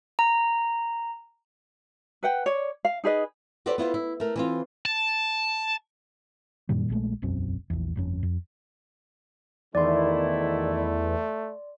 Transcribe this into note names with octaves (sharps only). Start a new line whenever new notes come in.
A#5
B4 F#5 G5
C#5 D5
F5
D#4 G#4 B4 D#5
F#4 G4 A4 B4 C5 D5
B3 E4 F4 C5
E4
A3 A#4
E3 C4 F4
A5
F#2 A#2 D#3 G3
A#1 A#2 G#3 A3
E1 B1 F#2 C4
A#1 E2
G1 F2 C#4
F2
E2 D#3 A3 E4 D5 C6